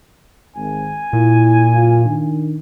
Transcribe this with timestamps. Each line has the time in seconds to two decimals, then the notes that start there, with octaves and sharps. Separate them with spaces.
0.56 G#1 G#5
1.13 A#2 E4
1.75 F#1 F4 F5
2.04 D#3 D4